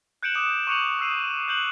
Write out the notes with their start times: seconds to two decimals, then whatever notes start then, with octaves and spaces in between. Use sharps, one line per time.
0.23 F#6 G6 C#7 D7 E7 F#7
0.35 D6 D#6 D7 E7
0.67 C#6 D6 F#6 C#7 F7 F#7
0.99 D#6 E6 C7 D#7
1.48 F#6 G6 F#7